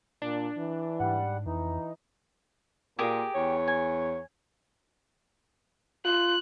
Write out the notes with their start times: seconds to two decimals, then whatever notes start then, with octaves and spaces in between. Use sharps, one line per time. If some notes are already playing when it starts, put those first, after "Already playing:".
0.22 A#2 D4
0.57 E3
1.00 G#2 G3 F#5
1.46 F2 E3 D#4
2.99 A#2 G4 G#4 A#4
3.34 E2 C#5
3.68 G#5
6.05 F4 F#6